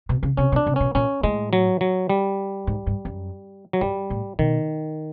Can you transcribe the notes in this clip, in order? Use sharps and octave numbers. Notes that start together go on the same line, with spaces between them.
B2
C#3
C3 C#4
B2
D4
C3
B2 C#4
A#2 C#4
A2 G#3
F#3
F#3
G3
G#2
G2
F#2
F#3
G2 G3
A2
B2 D#3